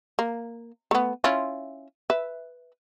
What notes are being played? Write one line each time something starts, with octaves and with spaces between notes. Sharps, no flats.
A#3
A3 B3
C#4 E4 F4
B4 E5